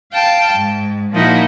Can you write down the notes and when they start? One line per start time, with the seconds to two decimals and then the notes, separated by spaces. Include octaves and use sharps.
0.12 F5 G5 A5
0.55 G#2
1.12 A#2 F3 A#3 D#4 E4 F#4